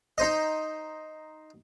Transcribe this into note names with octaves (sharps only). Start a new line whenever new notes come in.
D#4 C5 D#5